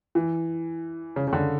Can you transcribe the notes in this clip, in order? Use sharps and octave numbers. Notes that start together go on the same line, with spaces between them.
E3
C#3
C#3
D3